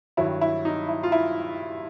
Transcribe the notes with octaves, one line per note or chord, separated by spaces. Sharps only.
G2 D#3 F#3 E4
E4
D#4
E4
F4
E4